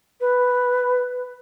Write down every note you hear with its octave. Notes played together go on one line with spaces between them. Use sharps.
B4